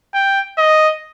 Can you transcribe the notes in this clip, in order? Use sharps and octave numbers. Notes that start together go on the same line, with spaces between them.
G5
D#5